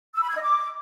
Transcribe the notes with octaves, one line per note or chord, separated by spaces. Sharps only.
E6
B5
G#6
D#5
D6